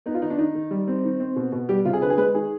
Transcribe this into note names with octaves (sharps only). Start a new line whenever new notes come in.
B3 D#4
F4
D#3 D#4
D4
D#3 D#4
D#3
G3
C4
D#3
C4
B2
B2
G3 G4
C3 F4
G#4
D3 B4
G#4
G#3 B4
D#3 G#4